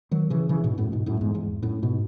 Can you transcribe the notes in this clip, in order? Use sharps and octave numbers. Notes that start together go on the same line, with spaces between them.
D#3 F#3
C#3 E3
C#3 E3
G#2 B2
F#2 A2
G#2 B2
F#2 A2
E2 G#2
E2 G#2
F#2 A2
G#2 B2